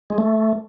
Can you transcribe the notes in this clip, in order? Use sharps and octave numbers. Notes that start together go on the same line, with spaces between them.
G#3
A3